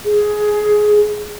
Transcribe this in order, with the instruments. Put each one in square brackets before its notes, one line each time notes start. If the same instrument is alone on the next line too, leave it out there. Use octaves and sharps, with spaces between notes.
[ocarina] G#4